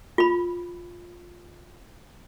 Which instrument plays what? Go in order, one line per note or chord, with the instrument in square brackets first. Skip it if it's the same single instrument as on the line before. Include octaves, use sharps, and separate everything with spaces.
[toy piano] F4 B5